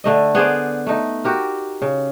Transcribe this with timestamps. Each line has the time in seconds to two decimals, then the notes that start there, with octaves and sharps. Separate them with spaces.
0.04 D3 A3 D#5
0.35 B3 G#4 C5 D5
0.87 A3 D#4
1.24 F#4 G4 A#4
1.82 C#3